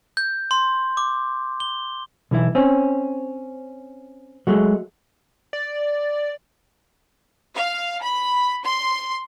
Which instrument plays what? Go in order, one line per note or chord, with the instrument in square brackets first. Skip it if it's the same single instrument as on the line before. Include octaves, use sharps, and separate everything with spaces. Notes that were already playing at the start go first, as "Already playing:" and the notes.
[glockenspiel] G6
C6
D6
G7
[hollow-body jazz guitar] B1 E3 E4
C4 C#4
F#3 G#3 A3
[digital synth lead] D5
[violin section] F5
B5
C6